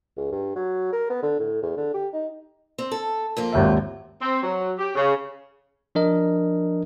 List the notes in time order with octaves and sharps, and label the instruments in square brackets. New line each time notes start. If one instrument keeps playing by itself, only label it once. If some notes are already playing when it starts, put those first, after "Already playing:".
[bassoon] C#2
G2
F#3
A#4
B3
D3
A2
E2
D3
G4
D#4
[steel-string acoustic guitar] C4
A4
F2 A#3 F4
[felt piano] G#1 D#2 E5
[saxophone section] C4
F#3
G4
C#3
[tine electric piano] F3 D4 A#4 D#5